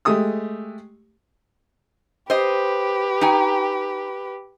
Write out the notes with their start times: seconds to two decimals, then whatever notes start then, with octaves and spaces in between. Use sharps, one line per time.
0.05 G#3 A3 G4 D#6 E6
2.30 G4 B4 C5 D#5
3.21 D#4 G5 G#5